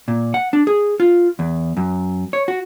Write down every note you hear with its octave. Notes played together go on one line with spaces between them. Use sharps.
A#2
F#5
D4
G#4
F4
E2
F#2
C#5
F#4